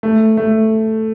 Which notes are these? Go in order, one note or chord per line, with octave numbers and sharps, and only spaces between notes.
A3
A3